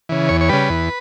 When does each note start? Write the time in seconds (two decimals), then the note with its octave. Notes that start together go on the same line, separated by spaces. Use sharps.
0.09 C#3 E3
0.29 E2 C#5
0.41 C#5
0.49 C#3 G3 B4
0.69 E2